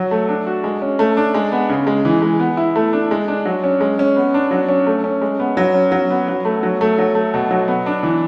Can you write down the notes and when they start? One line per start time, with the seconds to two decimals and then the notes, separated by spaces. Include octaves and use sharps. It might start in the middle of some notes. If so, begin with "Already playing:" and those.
Already playing: F#3
0.11 A3
0.28 D4
0.47 F#4
0.64 G#3
0.82 C#4
0.99 A3
1.17 D4
1.34 G#3
1.52 B3
1.69 C#3
1.87 G#3
2.05 E3
2.22 G#3
2.39 B3
2.57 E4
2.76 A3
2.93 D4
3.11 G#3
3.28 D4
3.45 F#3
3.64 C#4
3.81 G#3
3.99 C#4
4.16 B3
4.34 D4
4.51 F#3
4.68 C#4
4.87 A3
5.04 C#4
5.22 G#3
5.40 B3
5.57 F#3
5.74 C#4
5.92 F#3
6.10 B3
6.28 F#3
6.45 A3
6.63 F#3
6.81 A3
6.98 F#3
7.15 A3
7.34 B2
7.51 F#3
7.68 B3
7.86 D4
8.03 E3